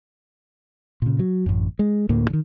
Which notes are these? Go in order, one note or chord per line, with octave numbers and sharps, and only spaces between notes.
A#2 C#3
F#3
A1 F#2
G#3
D2 A2 A#3
D3 D#3